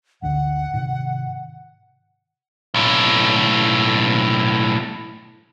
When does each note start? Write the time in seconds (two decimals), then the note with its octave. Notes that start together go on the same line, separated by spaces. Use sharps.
0.22 G#1 D2 D3 F#5
0.74 G#2 C3 D#3
2.74 B1 A2